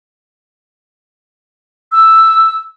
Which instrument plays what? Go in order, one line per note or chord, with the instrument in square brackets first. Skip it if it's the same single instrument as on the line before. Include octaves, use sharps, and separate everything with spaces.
[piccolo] E6